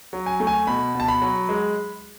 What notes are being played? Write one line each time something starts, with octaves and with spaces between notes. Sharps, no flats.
F#3
G#5
A3
G#5
B2 B5
B2
A5
B5
F#3
G#3